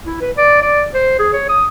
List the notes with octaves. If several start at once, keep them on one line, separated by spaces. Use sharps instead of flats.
E4
B4
D5
D5
C5
G#4
C#5
D#6